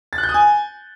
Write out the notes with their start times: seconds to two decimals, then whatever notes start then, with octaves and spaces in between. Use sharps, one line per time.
0.13 A6
0.18 F#6
0.23 G6
0.29 D#6
0.34 G#5